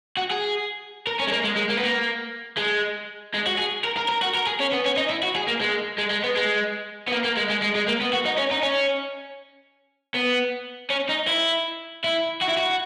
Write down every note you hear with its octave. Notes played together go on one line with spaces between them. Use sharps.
F#4
G#4
A#4
C#4
G#3
A#3
G#3
G#3
A#3
B3
A#3
G#3
G#3
F#4
G#4
A#4
A#4
A#4
F#4
A#4
G#4
C#4
B3
C#4
D#4
E4
F#4
G#4
A#3
G#3
G#3
G#3
B3
G#3
B3
A#3
A#3
G#3
G#3
G#3
G#3
A#3
B3
F#4
D#4
C#4
D#4
C#4
B3
C#4
D#4
E4
E4
F#4
E4
F#4